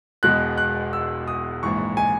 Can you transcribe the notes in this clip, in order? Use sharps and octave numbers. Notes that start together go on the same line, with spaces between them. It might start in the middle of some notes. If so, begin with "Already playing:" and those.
E1 E2 B2 G#3 F#6
F#6
E6
D#6
A#1 G#2 E3 C#6
G#5